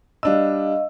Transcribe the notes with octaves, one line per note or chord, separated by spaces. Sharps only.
G3 D4 D#5 F5 E6